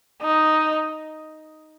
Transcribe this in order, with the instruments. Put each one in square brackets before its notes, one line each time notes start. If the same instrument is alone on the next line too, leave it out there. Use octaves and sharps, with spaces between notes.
[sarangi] D#4